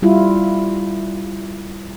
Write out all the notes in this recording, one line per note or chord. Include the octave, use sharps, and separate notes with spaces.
G3 E4 F4